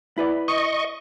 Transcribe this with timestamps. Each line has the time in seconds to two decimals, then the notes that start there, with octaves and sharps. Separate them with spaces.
0.18 E4 B4 D5
0.48 D#5 C#6